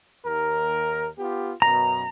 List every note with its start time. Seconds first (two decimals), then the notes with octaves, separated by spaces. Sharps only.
0.24 D#2 A#4
1.18 B3 F4 G4
1.62 F#2 B2 A#5